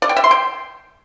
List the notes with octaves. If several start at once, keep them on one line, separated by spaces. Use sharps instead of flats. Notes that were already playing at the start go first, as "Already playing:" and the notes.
D5
G5
E5
C6
G5